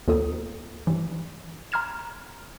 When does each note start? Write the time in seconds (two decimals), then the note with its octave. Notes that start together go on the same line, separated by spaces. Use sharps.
0.08 D#2 F4 A4 D#6
0.87 G2 E3
1.72 A#5 C6 F6 G#6 E7